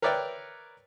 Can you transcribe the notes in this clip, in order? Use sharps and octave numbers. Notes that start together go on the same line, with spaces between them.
A#4 B4 C#5 D5 E5 G5